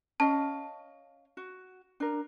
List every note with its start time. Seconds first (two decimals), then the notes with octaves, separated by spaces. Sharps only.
0.20 C#4 D#5 F5 A5
1.37 F#4
2.00 D4 A#4